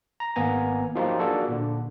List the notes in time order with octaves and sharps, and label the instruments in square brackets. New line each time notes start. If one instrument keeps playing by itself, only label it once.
[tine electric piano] A#5
G#1 A#3 B3 G#5 A#5
F3 F#3 A#3 D#4 F4 G4
A#3 D4 F#4 G#4 A4
A#2 D3